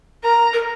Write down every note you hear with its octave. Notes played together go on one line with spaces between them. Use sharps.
A#4 A#5
A#4